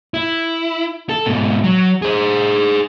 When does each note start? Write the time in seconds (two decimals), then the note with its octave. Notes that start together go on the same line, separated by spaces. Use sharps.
0.14 E4
1.09 A4
1.26 G#2 B2
1.63 F#3
2.02 G#4 C5